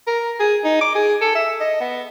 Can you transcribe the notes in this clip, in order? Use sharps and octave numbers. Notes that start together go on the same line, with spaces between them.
A#4
G#4
D#4
D6
G#4
A4
E5
D#5
B3